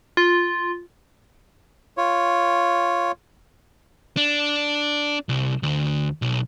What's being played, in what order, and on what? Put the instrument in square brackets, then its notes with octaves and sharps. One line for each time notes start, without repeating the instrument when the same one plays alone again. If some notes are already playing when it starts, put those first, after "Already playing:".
[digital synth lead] F4
[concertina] F4 C#5
[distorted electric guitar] D4
C2
D2
B1